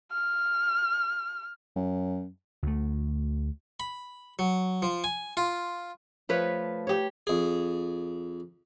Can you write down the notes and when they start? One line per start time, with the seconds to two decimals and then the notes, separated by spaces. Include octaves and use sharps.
0.12 F6
1.76 F#2
2.63 D2 A3
3.80 B5
4.39 F#3
4.82 F3
5.04 G#5
5.37 F4
6.29 F3 A3 B4 C#5
6.87 G4 C#5
7.27 F2 G#4